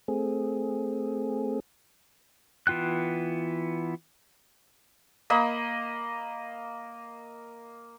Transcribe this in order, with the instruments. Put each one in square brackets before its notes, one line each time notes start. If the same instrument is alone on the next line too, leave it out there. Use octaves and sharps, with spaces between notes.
[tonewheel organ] A3 C4 G#4
[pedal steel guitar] E3 B3 F4 G5 F#6
[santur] A#3 D#5 B5